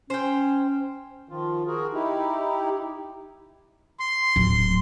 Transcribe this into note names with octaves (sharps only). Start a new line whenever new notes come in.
C#4 C5 G5
D#3 F3 F4
F#4 G#4 A#4
D#4 E4 G4
C6
D1